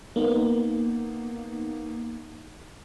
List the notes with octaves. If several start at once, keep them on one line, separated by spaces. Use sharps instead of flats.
A#3 B3 D#4